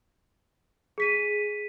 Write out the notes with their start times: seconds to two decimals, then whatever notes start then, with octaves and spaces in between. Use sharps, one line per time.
0.98 G#4 B6 D#7